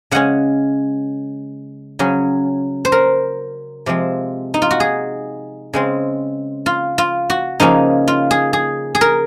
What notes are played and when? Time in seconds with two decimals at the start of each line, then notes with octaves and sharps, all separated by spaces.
0.11 C#3 G#3 C#4 F#5
1.99 C#3 F#3 C#4
2.85 C5
2.92 A#4
3.86 C3 F3 G#3 C4
4.54 D#4
4.62 F4
4.71 F#4
4.80 G#4
5.73 C#3 G#3 C4
6.66 F4
6.98 F4
7.30 F#4
7.60 C#3 F3 A#3 C#4 D#4
8.08 F4
8.31 G#4
8.53 G#4
8.95 G#4
9.01 A#4